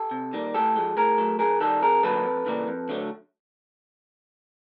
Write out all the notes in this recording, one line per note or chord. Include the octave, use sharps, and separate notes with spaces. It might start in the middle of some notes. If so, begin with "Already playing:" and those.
Already playing: G4 A4
C3
D#3 G3 A#3
A2 G4 A4
F3 G#3
A2 G#4 A#4
F#3 A3
F#2 G#4 A#4
D#3 G3 G4 A4
F2 G#4 A#4
D3 F#3 A#3 A4 B4
F2
C#3 E3 G3 A#3
F2
D3 F#3 A3